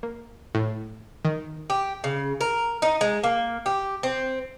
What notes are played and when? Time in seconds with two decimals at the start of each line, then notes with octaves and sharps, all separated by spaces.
0.03 A#3
0.55 A2
1.25 D#3
1.70 G4
2.04 C#3
2.41 A#4
2.82 D#4
3.01 G#3
3.24 A#3
3.66 G4
4.03 C4